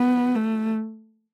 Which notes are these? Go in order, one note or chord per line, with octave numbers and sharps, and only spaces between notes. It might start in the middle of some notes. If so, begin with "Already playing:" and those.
Already playing: B3
A3